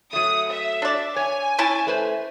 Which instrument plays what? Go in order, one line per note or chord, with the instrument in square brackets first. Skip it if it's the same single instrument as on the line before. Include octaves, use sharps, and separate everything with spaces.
[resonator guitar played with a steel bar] F#3 A3 [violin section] D#6
[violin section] E5
[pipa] D4 D5
[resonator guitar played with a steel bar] C#5 [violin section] G#5
[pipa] C#4 E4 A5
[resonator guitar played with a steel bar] A3 B4 C5